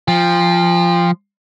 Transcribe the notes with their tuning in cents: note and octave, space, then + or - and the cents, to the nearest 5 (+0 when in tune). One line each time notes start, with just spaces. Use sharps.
F3 -5 G5 +40